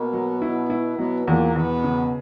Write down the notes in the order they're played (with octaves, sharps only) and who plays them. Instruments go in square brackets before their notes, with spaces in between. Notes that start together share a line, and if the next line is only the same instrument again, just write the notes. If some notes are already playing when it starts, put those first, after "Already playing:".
Already playing: [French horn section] B2 B3 [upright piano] A#3
[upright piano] F#3
E4
E4
[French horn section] B2 B3 [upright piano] F#3
[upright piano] E2 [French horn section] A#2 A#3
[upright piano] E2 [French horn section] B2 B3
[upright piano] C#3